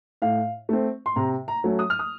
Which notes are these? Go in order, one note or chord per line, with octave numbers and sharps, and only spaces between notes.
A2 F5
A3 C4
C6
C3 A#5
A#5
F#3 A3 C#4
D#6
F6
D#6